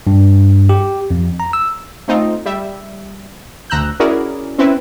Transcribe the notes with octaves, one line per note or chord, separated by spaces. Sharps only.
G2
G4
F2
A#5
E6
A3 C4 D#4 F4
G3 E5
D2 A#5 E6 F#6 G6
C#4 E4 F#4 G#4 A#4 D5
C4 C#4 E4 B4 E5